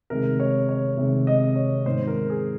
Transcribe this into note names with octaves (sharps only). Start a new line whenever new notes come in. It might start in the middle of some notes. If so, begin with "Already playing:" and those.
C3 D#3 G#3 A#4
C#5
C#5
C3 D#3 G#3
D#5
C#5
G#2 D#3 G#3 C5
A#4
G#4